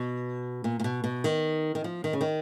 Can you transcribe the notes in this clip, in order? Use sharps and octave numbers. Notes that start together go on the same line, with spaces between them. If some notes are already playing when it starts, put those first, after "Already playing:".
Already playing: B2
A#2
A#2
B2
B2
D#3
D#3
F3
D#3
C#3
D#3